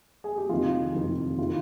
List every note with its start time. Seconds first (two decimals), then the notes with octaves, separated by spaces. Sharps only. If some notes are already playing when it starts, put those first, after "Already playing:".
0.24 G#4
0.38 G4
0.49 F2 C3 D#3 F4
0.94 F2 C3 D#3
1.38 D#3 F4